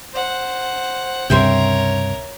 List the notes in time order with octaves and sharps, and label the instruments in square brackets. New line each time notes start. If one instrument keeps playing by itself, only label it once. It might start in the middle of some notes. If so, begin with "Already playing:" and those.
[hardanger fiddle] C5 F#5
[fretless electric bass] C#2 G2 C3 [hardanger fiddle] A#4 C#5 [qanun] C5 E5 G5